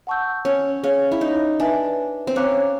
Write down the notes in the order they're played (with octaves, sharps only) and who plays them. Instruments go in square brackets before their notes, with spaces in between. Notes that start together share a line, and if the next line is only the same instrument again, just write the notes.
[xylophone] F#5 A5 C#6 E6 G6
[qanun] C#4
[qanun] C#4 [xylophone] G#4 C#5 F5
[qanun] E4
D#4
[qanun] D4 [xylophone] B4 E5 G#5
[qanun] C4
[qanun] C#4 [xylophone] C#5 F5 A#5 D6 F#6